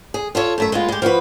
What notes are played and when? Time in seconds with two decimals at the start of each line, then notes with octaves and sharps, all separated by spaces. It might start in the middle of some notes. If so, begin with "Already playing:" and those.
0.14 G#4
0.35 F4 A4 C#5
0.58 F#2 A3 E5
0.72 G#3 B3 F4
0.88 G#3 G4
1.02 F3 E4 F#4 B4